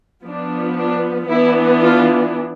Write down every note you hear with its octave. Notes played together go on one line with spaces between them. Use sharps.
F3 B3 D4
D4
E3 B3 D4 E4
F4